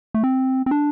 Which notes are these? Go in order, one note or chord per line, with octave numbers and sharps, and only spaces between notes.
A3
C4
C4
D4